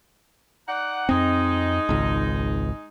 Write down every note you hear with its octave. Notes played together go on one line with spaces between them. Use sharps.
D#4 D5 F#5
F2 G#3 C4 D#4
G#1 C#2